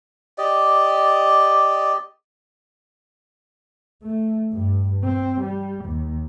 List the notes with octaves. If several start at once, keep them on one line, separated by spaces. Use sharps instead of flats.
G4 D5 D#5
A3
G2
C4
G3
D#2